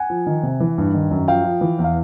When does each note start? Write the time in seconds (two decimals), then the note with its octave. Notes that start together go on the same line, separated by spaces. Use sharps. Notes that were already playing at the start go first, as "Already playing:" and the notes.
Already playing: F#5 G#5
0.10 F3
0.26 D#3
0.43 C3
0.60 E3
0.78 G2
0.94 D#3
1.11 F#2
1.28 F3 F5 G5
1.44 F3
1.61 E3
1.79 E2
1.84 F5